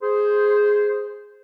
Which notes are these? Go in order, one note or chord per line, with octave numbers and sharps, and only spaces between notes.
G#4 C5